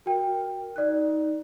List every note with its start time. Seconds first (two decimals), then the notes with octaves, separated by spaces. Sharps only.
0.06 F#4 A#4 G5
0.76 D#4 D5 F#6